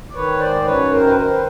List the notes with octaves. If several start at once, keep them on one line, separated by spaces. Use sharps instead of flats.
D5
D#3 B4 C#5
G#2 C5 D5
C5
F#2 B4 C#5
D#3 A#4 C5
B4
D#3 A#4 C5
B4